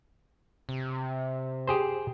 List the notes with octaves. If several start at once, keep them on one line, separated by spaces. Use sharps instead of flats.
C3
G4 G#4 C5